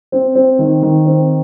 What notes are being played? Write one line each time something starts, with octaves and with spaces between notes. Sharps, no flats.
C4
C4
D#3
D#3
C4